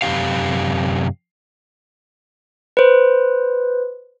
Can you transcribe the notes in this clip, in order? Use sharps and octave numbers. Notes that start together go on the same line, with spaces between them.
F#2 C3 G3 C#4 G4 F5
B4 C5